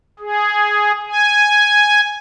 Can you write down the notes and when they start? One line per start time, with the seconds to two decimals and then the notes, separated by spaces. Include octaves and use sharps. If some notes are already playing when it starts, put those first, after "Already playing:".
0.19 G#4
1.07 G#5